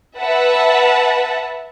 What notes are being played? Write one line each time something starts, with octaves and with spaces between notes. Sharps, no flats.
B4 E5 F#5 A5